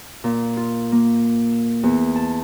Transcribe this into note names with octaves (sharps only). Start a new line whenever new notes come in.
A#2
F4
A#3
E2
A5